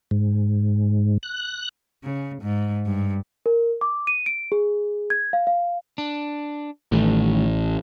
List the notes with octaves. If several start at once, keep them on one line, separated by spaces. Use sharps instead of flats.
G#2
F#6
C#3
G#2
G2
A#4
D6
D#7
D7
G#4
G#6
F5
F5
D4
A1 D#3 G3 A3